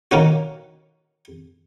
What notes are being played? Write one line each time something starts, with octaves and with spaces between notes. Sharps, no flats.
D#3 A#3 C#4 F#4